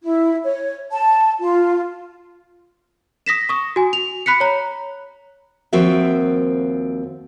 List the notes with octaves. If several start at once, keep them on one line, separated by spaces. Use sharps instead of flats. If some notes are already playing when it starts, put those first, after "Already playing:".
E4
C#5
A5
F4
D#6 A#6 B6 E7
C#6 D#6
F#4 G#5
F7
B5 F#6 B6 C#7
C#5 A#5
D#2 F3 C4 F#4 A#4 E5